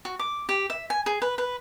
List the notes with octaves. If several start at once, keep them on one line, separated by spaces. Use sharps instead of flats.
F#4
D6
G4
E5
G#5
G#4
B4
B4